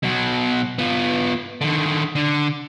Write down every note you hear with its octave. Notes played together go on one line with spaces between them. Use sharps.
B2 F#3
B3 F4
D3 D#3
D3